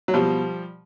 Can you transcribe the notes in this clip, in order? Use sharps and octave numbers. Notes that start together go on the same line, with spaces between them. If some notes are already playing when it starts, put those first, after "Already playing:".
F#3
B2 F3 G3